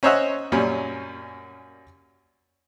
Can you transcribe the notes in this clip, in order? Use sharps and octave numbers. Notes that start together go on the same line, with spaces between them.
C#4 C5 C#5 D#5 E5 F#5
F#2 A#2 G3 C#4